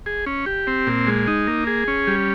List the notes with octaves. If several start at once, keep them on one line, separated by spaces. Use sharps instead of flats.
G#4
C#4
G4
C4
A#2
G#3
D#4
A#3
G#4
C#4
G3